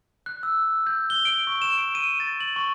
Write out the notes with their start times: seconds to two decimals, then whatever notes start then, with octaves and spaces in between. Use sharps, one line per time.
0.26 F#6
0.43 E6
0.87 G6
1.10 G7
1.25 D7
1.47 C#6
1.62 E7
1.78 D7
1.95 D#7
2.20 A6
2.40 F#7
2.56 C#6